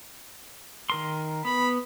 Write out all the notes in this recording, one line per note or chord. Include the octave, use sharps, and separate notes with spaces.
D#3 A#4 C6
B3 B5